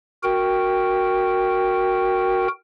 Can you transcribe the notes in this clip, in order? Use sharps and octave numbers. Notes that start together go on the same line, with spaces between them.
F#4 A#4 G5